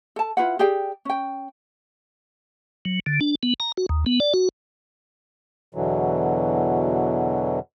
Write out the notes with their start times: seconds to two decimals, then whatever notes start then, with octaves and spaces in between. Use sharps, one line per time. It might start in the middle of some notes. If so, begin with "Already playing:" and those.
0.16 A4 A5
0.37 E4 F4 B4 F#5
0.59 G4 G#4 D5 G5
1.05 C#4 G5
2.85 F#3
3.06 D3
3.21 D4
3.43 B3
3.60 A#5
3.77 F#4
3.89 D#2
4.06 B3
4.20 D5
4.34 F#4
5.75 E2 B2 D3 E3 F#3